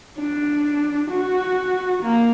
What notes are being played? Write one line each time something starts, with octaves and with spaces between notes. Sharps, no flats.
D4
F#4
A#3